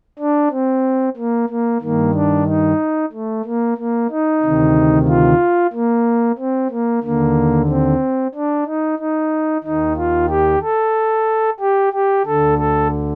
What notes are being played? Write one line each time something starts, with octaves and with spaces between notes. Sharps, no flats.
D4
C4
A#3
A#3
G2 D#3 A#3
D4
D#4
A3
A#3
A#3
D#4
D2 C3 D#3
F4
A#3
C4
A#3
D#2 D3 A#3
C4
D4
D#4
D#4
D#2 D#3 D#4
F4
G4
A4
G4
G4
D2 D3 A4
A4